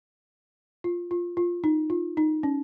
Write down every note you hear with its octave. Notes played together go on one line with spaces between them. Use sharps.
F4
F4
F4
D#4
F4
D#4
C#4